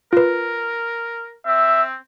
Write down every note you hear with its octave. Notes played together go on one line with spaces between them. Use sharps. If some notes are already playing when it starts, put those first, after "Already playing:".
F4 A#4 B4
C4 E5